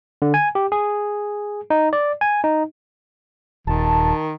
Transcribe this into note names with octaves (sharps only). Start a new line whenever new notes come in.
D3
G#5
G4
G#4
D#4
D5
G#5
D#4
D#1 D#3 A5